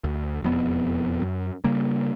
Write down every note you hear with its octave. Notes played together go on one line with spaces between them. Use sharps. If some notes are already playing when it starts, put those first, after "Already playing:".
D2
E1 F2 B3
F#2
C#3 G3 A#3